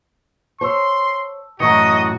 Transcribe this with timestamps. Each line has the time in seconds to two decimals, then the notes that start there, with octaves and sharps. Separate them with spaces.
0.61 C5 C#5 A5 C6 E6
1.60 F#2 A2 E3 F#4 D#5 A#5 C#6 C#7